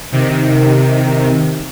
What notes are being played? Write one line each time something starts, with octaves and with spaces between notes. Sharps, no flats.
C3 D#3